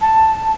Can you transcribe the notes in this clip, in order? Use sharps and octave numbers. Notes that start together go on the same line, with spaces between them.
A5